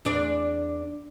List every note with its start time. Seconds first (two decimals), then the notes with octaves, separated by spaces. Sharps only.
0.05 E2 D4 D5